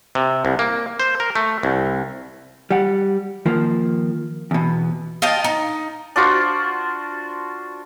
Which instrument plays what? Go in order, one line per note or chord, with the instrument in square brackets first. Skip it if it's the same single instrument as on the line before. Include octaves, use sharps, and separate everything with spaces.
[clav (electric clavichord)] C3
C2
A#3
C5
A#4
A3
C2
[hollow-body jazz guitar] G3 F#5
D#3 F3 A#3
E2 B2
[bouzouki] F4 D#5 G5 A5
D#4
[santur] D4 F4 F#4 C5